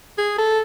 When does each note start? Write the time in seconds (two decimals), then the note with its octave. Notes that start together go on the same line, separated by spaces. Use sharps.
0.18 G#4
0.38 A4